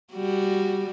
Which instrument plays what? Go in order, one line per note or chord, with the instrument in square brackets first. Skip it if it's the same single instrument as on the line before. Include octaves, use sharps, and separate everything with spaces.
[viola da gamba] G3 F#4